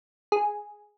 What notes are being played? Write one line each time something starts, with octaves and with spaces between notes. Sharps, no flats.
G#4